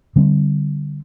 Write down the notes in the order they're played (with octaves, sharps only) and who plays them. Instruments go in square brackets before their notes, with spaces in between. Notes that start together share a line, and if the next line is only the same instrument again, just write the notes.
[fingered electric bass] D3 G3 C4